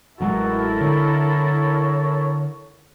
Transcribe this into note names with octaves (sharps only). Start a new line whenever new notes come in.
A1 F#3 G#3 E4 F#4 A4 A#4
D3 C#5